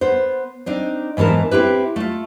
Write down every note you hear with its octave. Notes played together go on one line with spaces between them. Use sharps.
B3 C5
C4 D4 D#4
G#2 E3 B3 A#4 A5
C4 E4 G4 B4
A3 F4